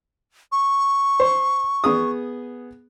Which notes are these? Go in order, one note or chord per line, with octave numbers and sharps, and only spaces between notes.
C#6
C5
B3 G#4 D#6